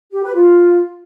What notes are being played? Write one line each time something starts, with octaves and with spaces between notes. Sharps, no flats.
G4
B4
F4